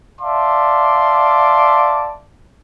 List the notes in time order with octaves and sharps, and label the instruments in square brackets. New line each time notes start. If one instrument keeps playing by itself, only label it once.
[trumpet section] D5 E5 F5 A5 C6 D6